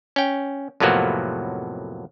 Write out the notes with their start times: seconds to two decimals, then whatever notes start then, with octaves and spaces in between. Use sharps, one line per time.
0.16 C#4 G5
0.80 F2 A2 C3 F#3 A#3 B3